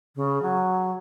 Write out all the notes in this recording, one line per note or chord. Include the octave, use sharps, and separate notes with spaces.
C#3
F#3